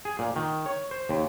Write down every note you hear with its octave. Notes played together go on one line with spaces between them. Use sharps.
G#4
A#2
D#3
C#5
C5
D#2